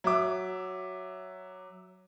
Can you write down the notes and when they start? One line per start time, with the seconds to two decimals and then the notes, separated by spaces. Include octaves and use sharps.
0.04 F#3 E5 D6